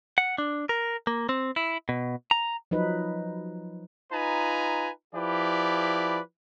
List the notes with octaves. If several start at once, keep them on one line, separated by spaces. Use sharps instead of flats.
F#5
D4
A#4
A#3
C4
E4
B2
A#5
F3 F#3 D#4 B4
D#4 F4 B4 G#5 A#5
F3 E4 G4 B4 D5